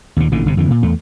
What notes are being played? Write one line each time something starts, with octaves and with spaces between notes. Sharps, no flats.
D#2 A#2
A1 A#2 D3 E3
G1 G2 C3
F2 D3 E3
A#2
E2 A3